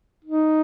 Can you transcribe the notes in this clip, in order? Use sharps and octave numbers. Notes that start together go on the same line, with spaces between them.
D#4